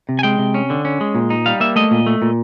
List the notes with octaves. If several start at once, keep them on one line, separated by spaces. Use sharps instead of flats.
C3
G#5
G#3 G5
C3
C#4
D3
C#4
G#3
A#2
D#4
G3 F5
A#3 E5
A3 D#5
A#2
A3
A#2